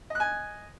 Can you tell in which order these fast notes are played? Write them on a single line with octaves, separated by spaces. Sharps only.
D#5 F#6 G#5